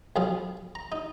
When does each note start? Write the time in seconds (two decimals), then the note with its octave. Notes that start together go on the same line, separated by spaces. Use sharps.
0.16 B1 F3 G#4 F5
0.75 A#5
0.92 D#4